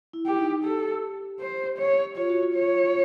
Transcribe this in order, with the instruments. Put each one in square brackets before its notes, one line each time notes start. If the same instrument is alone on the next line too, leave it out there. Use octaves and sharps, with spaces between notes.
[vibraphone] E4
[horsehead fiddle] G4
[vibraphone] D#4
[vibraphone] G4 [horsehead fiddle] A4
[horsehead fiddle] C5
C#5
[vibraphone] F4 [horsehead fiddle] C#5
[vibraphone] F#4
F4
[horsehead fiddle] C#5